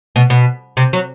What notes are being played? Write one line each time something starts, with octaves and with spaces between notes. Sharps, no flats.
B2
B2
C3
F#3